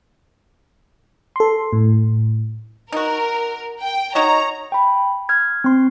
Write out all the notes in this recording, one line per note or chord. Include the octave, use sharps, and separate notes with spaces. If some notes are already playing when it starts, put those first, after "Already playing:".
A4 C6
A2
D#4 F#4 A#4
G5
D#4 F#4 C#5 D#5 A#5
G5 B5
F6 G#6
C4 C6